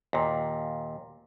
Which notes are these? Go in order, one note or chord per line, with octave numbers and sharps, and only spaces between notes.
D#2 A#2